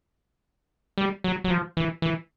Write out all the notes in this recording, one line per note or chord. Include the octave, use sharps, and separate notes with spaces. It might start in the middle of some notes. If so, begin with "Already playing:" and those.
G3
F#3
F#3
F3
E3
E3